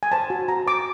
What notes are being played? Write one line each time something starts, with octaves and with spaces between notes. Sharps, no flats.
G#5
C5 A5
F#4
F#4 A#5
C5 D6